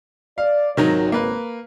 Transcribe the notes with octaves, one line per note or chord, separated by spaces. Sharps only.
D5 F5
G#1 C#2 D#3 F#3 D#4
A#3 B4